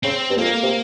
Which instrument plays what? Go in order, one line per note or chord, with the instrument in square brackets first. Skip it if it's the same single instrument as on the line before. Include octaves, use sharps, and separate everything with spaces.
[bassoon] C#3 [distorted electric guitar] C4
[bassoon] G2
[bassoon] F2 [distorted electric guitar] A#3
[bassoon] C3